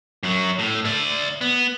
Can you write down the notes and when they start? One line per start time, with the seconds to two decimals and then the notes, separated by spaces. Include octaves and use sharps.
0.23 F#2 F#3
0.59 A2
0.85 D5 E5
1.41 B3